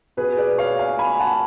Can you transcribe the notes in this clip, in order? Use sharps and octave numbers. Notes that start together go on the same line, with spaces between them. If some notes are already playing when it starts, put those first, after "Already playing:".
B2 G#4 B4
B4 D5
C#5 F5
F5 G#5
G#5 B5
F#5 A5